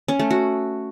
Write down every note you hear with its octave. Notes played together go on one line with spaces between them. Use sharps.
C#4
A3
F#4